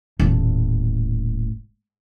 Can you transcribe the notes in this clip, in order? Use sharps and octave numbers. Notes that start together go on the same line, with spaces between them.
D#1 A2